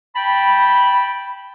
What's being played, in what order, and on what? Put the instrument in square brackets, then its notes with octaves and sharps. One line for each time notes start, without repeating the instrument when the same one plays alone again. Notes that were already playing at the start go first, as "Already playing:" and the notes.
[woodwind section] G5 A5 B5